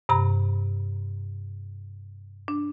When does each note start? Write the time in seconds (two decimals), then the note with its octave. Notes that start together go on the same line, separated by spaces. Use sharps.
0.09 G2 C3 A#5 B5
2.48 D4